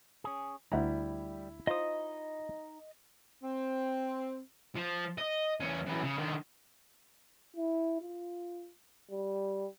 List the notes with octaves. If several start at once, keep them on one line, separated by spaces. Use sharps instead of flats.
C#4 G#4
D2 G3 E4 E5 F#5 A#5
D#4 F4 C5 D#5 D#6
C4
F3
D#5
E2 C#4
F#2 E3
C#3
D3 D#3
E4
F4
G3